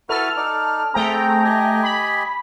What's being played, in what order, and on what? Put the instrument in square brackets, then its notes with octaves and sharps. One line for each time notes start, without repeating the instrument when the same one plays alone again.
[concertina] E4 F#4 B4 [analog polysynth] A4 F6
[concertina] D#4 D5
[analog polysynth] A3 G5 A#5 [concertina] C4 G#4
[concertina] G4 D#5 G#5
[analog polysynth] B5